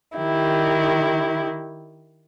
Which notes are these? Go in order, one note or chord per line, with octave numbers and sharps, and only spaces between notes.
D#3 E4 G4